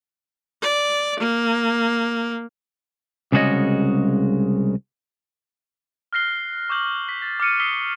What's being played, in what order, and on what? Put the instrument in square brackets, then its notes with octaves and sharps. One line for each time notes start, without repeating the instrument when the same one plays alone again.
[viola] D5
A#3
[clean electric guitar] C2 C#3 G#3 F#4 C#5 D#5
[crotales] F6 F#6 A#6 C7 G7
C#6 D6 E6 G6 F#7
B6
A6
D6 F6 C#7 D#7
D#6 E6 B6 C7 G7